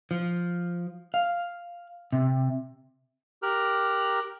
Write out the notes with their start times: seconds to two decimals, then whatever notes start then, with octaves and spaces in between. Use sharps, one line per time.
0.11 F3
1.14 F5
2.13 C3
3.43 G4 A#4 A#5 F6 F#6